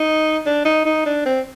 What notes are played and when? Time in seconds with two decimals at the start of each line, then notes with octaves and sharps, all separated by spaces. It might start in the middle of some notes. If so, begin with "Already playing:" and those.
Already playing: D#4
0.46 D4
0.65 D#4
0.86 D#4
1.06 D4
1.26 C4